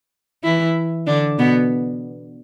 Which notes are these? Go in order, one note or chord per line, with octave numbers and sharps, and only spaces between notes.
E3 E4
D3 D4
B2 B3